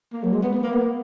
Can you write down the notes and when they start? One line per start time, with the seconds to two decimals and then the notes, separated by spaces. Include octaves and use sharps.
0.13 A#3
0.23 F#3
0.33 G#3
0.43 B3
0.53 B3
0.63 A#3
0.73 B3